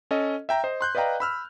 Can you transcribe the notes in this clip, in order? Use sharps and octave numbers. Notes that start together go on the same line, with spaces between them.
C#4 A4 D#5
E5 G5 A#5
C5 D#5
C6 F#6 G6
B4 D5 D#5 F5 G5 A#5
B5 E6 F6